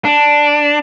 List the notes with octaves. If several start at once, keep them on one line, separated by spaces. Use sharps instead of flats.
D4